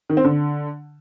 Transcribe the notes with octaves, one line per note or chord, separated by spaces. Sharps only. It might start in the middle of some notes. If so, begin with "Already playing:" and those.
D#3
C4
D3